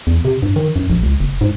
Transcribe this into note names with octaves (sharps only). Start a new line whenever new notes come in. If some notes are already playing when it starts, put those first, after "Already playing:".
E2
C3
G2
D#3
F#2
A#1
C#2
F#1
G#2